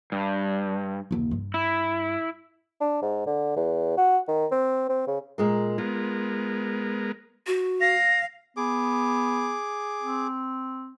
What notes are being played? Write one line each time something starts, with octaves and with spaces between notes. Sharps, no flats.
G2
F#1 D#2
G2
E4
D4
G#2
D3
E2
F#4
D#3
C4
C4
C#3
A#2 G#3 A#3
G#3 B3 F4 A#4
F#4
F5 A#6
B3 G#4 D6
C4